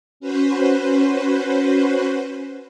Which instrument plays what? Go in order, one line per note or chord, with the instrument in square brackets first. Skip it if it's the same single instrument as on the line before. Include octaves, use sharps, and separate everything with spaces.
[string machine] C#4 F#4 B4 C5